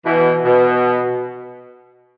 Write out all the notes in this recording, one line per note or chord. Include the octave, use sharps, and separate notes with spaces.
B2 E3
B2